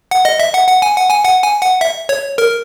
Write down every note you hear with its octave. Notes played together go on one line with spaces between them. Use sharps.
F#5
D#5
E5
F#5
F#5
G#5
F#5
G#5
F#5
G#5
F#5
E5
C#5
A#4